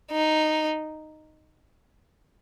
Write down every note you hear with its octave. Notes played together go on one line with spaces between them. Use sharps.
D#4